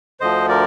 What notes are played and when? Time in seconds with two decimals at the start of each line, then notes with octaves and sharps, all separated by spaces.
0.20 D2 D3 F3 C5 D#5
0.49 A#4 D5